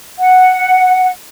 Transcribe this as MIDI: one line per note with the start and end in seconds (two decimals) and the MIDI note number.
0.19 1.09 78